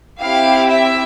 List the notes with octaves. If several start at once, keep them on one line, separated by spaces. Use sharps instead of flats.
C4 E4 G4 F5
E5